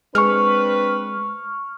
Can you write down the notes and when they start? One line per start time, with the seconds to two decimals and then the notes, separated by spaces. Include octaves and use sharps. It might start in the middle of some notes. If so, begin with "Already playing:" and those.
0.15 G#3 C4 D4 B4 C#6 F6